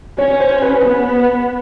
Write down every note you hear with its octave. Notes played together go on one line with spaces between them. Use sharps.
C#4 C#5
C5
B4
B3 B4